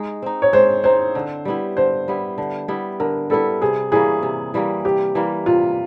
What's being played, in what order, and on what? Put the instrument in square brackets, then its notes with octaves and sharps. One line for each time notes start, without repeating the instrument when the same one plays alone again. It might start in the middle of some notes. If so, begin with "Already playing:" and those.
Already playing: [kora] G#3 D#4
C4 D#4
[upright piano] C#5
[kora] G#3 [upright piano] C5
[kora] C4 D#4 [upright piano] C5
[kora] D3
G3 B3 E4
[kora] D3 [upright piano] C5
[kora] G3 B3 E4
D3
G3 B3 E4
[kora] D3 [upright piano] A#4
[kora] G3 B3 E4 [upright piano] A4
[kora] C3 [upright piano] G#4
[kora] E3 G3 A#3 [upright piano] G#4
[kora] C3
E3 G3 A#3
[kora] C3 [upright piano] G4
[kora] E3 G3 A#3
[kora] C3 [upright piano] F4